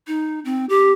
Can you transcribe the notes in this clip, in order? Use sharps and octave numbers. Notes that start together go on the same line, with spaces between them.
D#4
C4
G4